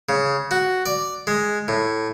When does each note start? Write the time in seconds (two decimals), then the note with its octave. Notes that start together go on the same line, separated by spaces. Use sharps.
0.09 C#3
0.51 F#4
0.86 D5
1.27 G#3
1.68 A2